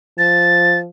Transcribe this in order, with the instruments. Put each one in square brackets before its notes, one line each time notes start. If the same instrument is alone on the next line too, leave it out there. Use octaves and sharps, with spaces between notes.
[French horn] F3 [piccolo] A6